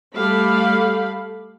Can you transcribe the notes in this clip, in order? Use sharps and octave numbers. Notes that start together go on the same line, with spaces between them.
G3 A3 G4 A4 F5 B5